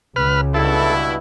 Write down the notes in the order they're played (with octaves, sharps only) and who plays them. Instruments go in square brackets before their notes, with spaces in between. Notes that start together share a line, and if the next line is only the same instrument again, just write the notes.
[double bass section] C#2 C#3 [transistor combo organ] B4 F6
[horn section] G2 B2 E4 [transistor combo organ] A4